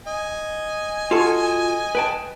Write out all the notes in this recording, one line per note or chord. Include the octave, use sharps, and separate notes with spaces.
D#5 G#5
F4 F#4 A4
B4 G5 A5